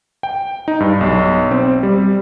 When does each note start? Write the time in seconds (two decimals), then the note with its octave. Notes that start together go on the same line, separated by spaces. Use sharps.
0.23 G5
0.68 D#4
0.80 G2
1.01 B1
1.51 C4
1.83 G3